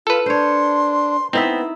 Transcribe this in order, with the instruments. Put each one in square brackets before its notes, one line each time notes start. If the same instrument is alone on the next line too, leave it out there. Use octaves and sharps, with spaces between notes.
[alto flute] F4 [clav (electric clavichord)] A4 B4
[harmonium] D4 [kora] C5 C#5 [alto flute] C6
[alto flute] B3 [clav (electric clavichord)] C4 [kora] D#4 E4 E5